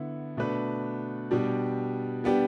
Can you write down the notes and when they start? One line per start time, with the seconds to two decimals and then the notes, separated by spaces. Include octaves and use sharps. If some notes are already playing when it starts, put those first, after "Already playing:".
Already playing: D3 B3 E4
0.37 B2 A3 D4 B4
1.31 B2 G3 D4 G4
2.24 G3 B3 D4 G4